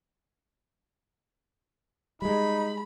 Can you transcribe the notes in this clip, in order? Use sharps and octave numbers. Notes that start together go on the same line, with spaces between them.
G3 G#3 D#4 B5